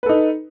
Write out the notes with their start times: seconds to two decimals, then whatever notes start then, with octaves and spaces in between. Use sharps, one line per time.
0.03 B4
0.06 A4
0.09 D#4